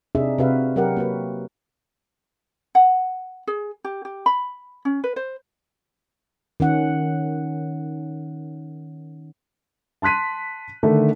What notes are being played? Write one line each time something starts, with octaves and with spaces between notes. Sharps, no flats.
C3 D4 D#4 G#4 E5
C3 F#4 B4 E5 F5
F#3 G4 A#4 F#5
A#3 F#4 B4
F#5
G#4
G4
G4
B5
C#4
B4
C5
D#3 C#4 F#5
A5 C6 F#6 B6 D#7
D3 D#3 A3